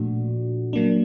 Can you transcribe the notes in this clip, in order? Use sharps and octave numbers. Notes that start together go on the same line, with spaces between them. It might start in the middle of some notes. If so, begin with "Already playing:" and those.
Already playing: A#2 F3 A3 D4 F#4
F#3 A#3 D4